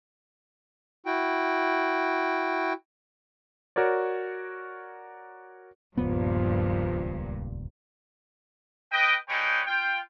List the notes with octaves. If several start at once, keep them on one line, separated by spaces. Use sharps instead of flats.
E4 F#4 G5
F#4 A#4 C#5 D5
D#1 C#2 G2 A#2 F3 B3
B4 D#5 G5
G3 G#3 D#4 B4 C#5 G5
F4 G5